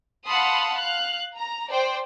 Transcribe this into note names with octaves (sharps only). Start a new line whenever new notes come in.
F5 F#5 A5 B5 C6 D#6
F5 F#6
A#5
C5 D5 G5